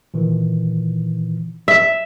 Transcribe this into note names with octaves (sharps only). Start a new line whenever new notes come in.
A#2 D#3 E3
E5